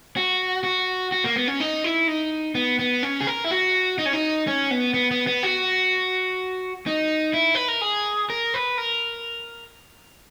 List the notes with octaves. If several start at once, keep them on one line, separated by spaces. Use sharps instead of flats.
F#4
F#4
F#4
A#3
B3
C#4
D#4
E4
D#4
B3
B3
C#4
G#4
A#4
E4
F#4
D#4
C#4
D#4
C#4
B3
B3
B3
B3
F#4
D#4
E4
B4
A#4
G#4
A#4
B4
A#4